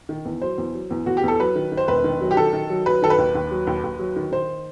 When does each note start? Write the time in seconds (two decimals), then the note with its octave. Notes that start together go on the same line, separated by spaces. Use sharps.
0.09 D#3
0.25 E2
0.42 F#3 C5
0.58 E2
0.74 F#3
0.91 E2
1.06 E2 F#4
1.17 G4
1.23 E2 A4
1.40 F#3 B4
1.55 D#3
1.72 D#3
1.77 C5
1.88 E1 B4
2.04 D#3
2.21 F#3
2.31 G4
2.37 D#3 A4
2.53 D#3
2.70 F#3
2.86 F#3 B4
3.02 D#3 A4
3.10 B4
3.18 D#2
3.35 D#2
3.51 F#3
3.67 D#2
3.83 D#2
3.99 F#3
4.16 D#3
4.32 D#3 C5